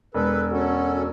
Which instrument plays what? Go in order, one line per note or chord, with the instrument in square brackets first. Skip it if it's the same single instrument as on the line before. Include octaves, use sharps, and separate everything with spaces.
[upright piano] E1 [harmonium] A4 B4
[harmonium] C#4 A4 [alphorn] F#4